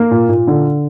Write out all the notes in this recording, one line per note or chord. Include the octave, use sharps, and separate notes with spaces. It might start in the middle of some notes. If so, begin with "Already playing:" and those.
Already playing: A#3
A#2
A#2
D3